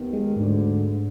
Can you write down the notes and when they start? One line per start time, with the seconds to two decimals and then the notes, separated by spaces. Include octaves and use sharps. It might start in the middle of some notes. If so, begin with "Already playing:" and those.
Already playing: D#2 D#3 B3
0.13 G#3
0.36 D2 G#2 D3